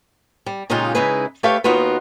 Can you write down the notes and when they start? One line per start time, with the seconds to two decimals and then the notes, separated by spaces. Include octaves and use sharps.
0.46 G3
0.70 A#2 C#3 G#3 D#4 F4 G4
0.95 C#3 G#3 D#4 E4 G#4 B4
1.43 A3 G4 A4 B4 C#5 F5
1.64 D#2 B3 D#4 F4 F#4 B4